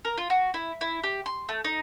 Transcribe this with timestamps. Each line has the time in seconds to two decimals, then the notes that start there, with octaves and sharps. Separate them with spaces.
0.05 A#4
0.18 F4
0.30 F#4
0.54 E4
0.81 E4
1.03 G4
1.26 C6
1.49 A3
1.64 D#4